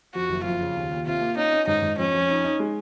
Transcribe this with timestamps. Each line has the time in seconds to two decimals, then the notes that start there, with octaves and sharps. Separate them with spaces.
0.15 F2 F#4
0.30 F#1
0.44 F2 F4
0.61 C#3
0.76 D#2
0.91 D#2
1.06 C3 F4
1.21 A#3
1.36 C#4 D#4
1.53 C#4
1.67 G#2 D#4
1.82 G#2
1.98 F2 C#4
2.14 F2
2.29 D#4
2.44 D#4
2.59 G#3